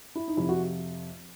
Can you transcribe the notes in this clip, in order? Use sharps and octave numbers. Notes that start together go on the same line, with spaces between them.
E4
D#4
F2 C3 F3 E4
F#4